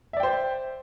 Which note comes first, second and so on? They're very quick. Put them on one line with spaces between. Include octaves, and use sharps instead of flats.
E5 D5 G5 C5